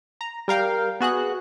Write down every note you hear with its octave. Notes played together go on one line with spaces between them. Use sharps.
A#5
G3 A#4 F5 G5
B3 F#4 G#4 F#6